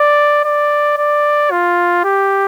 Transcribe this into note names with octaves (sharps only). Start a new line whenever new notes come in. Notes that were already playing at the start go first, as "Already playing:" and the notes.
Already playing: D5
D5
D5
F4
G4